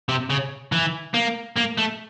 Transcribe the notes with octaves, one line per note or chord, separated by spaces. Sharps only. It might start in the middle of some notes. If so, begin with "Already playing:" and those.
C3
C#3
E3
A#3
A#3
A3